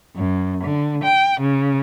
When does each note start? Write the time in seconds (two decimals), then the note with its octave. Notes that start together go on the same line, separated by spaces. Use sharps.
0.16 F#2
0.64 D3
1.04 G5
1.41 C#3